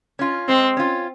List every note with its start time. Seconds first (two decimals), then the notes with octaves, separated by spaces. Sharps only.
0.19 C#4 F4
0.48 G#3 C4
0.77 C#4 F4